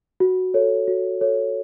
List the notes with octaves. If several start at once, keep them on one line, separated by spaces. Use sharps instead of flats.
F#4
A4 C#5
F#4
A4 C#5